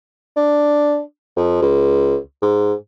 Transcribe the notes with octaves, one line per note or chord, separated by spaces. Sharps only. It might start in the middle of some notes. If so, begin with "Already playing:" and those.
D4
F2
C#2
G#2